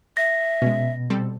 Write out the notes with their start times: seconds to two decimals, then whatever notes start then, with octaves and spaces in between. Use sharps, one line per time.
0.17 E5 A#6
0.62 B2 G#3 C#4
1.10 G3 C4 A4